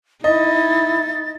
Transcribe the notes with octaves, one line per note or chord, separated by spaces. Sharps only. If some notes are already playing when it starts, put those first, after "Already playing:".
D#4 E4 D#5 A6